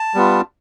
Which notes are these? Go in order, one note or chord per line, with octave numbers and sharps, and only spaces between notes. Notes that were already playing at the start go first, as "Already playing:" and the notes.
Already playing: A5
G3 B3 F4